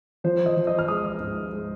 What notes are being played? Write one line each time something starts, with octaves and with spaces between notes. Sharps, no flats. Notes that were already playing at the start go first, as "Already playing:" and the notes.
F3 C5
D#5
F3
D#5
F6
G#3 D#6
G#2
G#3